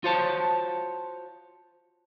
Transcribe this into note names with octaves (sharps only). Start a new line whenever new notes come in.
F4 F#4 C5 C#5 A5